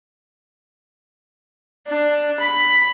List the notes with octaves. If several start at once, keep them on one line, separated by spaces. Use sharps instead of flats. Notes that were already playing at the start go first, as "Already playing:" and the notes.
D4
B5